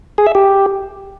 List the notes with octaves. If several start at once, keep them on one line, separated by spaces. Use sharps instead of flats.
G#4
E5
G4